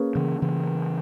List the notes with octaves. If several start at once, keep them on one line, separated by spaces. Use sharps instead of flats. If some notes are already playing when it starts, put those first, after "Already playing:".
Already playing: A#3 C#4 G#4 B4
C#3 E3
C#3 E3